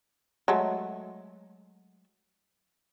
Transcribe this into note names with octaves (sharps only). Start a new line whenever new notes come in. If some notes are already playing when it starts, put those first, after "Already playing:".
F#3 G#3 A3